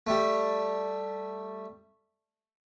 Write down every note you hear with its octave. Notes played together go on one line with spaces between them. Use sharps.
G3 A3